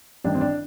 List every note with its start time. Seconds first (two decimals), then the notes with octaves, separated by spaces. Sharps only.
0.24 A1 G2 D#3 D4
0.35 C4
0.41 D4